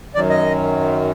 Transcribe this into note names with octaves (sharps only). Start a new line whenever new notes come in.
F#2 D#3 F#3 D5
D#5